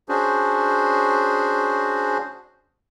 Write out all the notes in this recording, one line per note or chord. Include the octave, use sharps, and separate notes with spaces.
C#4 D4 F#4 G#4 C5